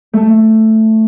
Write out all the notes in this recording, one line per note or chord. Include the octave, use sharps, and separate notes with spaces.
A3